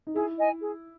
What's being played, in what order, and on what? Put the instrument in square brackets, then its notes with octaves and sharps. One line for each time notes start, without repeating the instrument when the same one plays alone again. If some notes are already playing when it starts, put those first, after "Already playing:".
[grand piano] D#4
[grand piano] E4 [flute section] G#4
[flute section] D#5 G#5
G#4